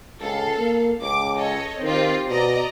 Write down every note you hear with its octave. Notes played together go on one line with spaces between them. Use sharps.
C#2 A4 F5
A#3
C#2 D6
A4 C#5 D#5
D#3 C4 F4 G4
B2 D5 D#5 A#5